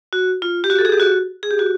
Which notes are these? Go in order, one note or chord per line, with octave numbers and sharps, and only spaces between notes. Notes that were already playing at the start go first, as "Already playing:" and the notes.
F#4
F4
G4
F#4
A4
G#4
G4
F#4
G#4
G4
F#4